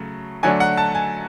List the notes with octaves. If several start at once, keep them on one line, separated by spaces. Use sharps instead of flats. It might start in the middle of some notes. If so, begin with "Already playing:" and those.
Already playing: C#3 F#3 A3
D3 F#3 A3 D4 G#5
F#5
A5
G#5